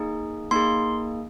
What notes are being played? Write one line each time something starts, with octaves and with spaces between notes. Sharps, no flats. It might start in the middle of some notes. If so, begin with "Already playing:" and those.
Already playing: A#3 D#4 G#4
A#3 D#4 G#4 C6